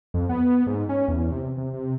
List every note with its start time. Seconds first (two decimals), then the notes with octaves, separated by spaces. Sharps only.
0.14 F2
0.29 B3
0.67 G#2
0.89 C#4
1.08 E2
1.32 C3
1.58 C3
1.74 C3